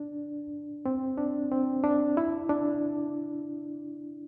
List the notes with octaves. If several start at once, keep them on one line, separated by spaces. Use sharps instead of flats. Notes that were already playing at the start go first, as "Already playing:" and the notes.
Already playing: D4
C4
D4
C4
D4
E4
D4